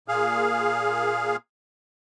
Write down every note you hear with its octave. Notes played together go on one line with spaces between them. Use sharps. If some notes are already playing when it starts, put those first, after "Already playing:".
A#2 G#4 F5